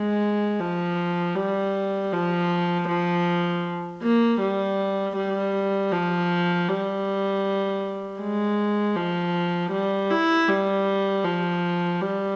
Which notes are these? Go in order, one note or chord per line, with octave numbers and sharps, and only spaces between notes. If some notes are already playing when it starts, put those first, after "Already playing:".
Already playing: G#3
F3
G3
F3
F3
A#3
G3
G3
F3
G3
G#3
F3
G3
E4
G3
F3
G3